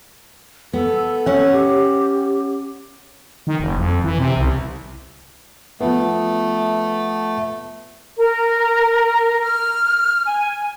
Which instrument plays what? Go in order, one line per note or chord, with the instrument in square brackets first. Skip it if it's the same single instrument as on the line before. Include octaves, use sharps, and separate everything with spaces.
[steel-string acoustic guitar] B3 [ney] A4
[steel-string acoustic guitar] C#4 F#5
[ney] G4
[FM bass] D#3
F#1
F2
E3
C3
C2
[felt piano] F3 B3 [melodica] A3
[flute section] A#4
F6
G#5